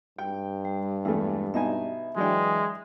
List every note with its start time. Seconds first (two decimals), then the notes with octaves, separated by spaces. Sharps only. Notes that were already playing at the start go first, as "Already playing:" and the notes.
0.19 G2 G5
0.65 G3
1.05 E2 G#3 A3
1.54 B2 D#4 E5 G#5
2.16 E3 F#3 G#3 D4 G5